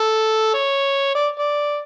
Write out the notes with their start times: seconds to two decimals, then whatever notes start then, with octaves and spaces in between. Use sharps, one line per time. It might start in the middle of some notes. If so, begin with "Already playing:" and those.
Already playing: A4
0.54 C#5
1.15 D5
1.39 D5